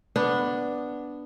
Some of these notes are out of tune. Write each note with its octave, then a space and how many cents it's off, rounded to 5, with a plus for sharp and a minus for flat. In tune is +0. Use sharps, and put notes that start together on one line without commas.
B3 +0 D4 +0